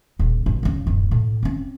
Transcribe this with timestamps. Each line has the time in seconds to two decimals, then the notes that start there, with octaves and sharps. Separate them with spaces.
0.19 D#1
0.46 G#1
0.63 E2 C#3
0.87 D1 F#2
1.11 A2
1.43 C4 C#4